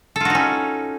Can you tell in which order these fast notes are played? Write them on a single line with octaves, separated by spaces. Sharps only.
A4 F4 F#4 D#4 C#4